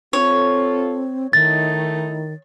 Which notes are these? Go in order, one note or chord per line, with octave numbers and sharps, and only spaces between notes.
C4 F4 A4 C#5
D#3 A3 D#4 E4 A6